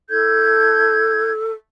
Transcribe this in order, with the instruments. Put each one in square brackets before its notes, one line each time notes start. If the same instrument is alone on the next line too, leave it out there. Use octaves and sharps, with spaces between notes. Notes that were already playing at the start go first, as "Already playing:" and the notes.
[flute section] E4 G6 G#6 [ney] A4